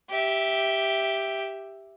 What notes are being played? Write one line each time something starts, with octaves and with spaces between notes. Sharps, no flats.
G4 E5